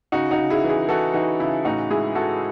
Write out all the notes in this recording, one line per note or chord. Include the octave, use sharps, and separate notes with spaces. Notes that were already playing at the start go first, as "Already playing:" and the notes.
C#3 D#4 F#4
D#4 F#4
C#3
E4 G#4
E3
E4 G#4
E3 F#4 A4
E3 D#4 F#4
C#3 E4
A2 D#4 F#4
G#3 E4 G#4
G#3 F#4 A4